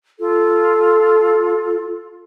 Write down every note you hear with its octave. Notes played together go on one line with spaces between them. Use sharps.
F4 A4